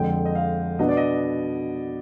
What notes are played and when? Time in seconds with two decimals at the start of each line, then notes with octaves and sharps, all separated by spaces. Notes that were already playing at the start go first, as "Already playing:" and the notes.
Already playing: F2 D3 F3 G#3 G5
0.25 D#5
0.35 F5
0.79 B2 B3 D4 D#5
0.89 D5
0.97 D#5